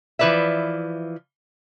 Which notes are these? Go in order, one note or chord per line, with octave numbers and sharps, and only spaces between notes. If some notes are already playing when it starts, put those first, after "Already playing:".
E3 F3 B4 D5 E5